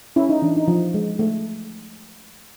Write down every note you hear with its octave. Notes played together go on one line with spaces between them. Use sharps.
C#4 E4
D#4
E3 D4
D#4
F3
G#3
A3